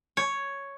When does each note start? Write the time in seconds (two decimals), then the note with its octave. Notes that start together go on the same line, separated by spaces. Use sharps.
0.17 C#5